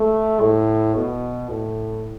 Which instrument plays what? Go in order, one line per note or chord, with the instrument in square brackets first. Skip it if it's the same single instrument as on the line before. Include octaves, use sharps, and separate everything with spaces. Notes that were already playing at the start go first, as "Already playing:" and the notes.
Already playing: [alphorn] A3
A2
B2
A2